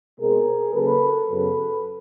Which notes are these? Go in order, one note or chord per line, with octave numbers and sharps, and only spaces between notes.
B2 G#3 C4 G#4 A#4
C#3 F#3 A#3 A4 B4
F#2 C#3 F#3 B3 A4 B4